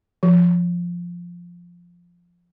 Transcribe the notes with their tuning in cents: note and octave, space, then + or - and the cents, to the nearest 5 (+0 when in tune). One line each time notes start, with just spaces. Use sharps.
F3 +0